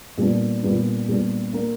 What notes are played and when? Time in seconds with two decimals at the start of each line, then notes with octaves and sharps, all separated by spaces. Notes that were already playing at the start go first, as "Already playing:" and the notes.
0.17 A#2 G3 B3 D4
0.62 A#2 G3 B3 D4
1.08 A#2 G3 B3 D4
1.53 A#3 D4 A#4